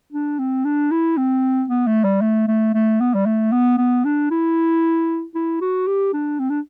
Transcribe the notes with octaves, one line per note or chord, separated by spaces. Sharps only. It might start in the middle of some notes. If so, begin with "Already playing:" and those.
D4
C4
D4
E4
C4
B3
A3
G3
A3
A3
A3
B3
G3
A3
B3
B3
D4
E4
E4
F#4
G4
D4
C4
D4